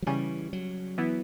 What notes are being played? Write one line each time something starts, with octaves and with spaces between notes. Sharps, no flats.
F#3
C#3 E3 G3 C#4
F#3
E3 B3 E4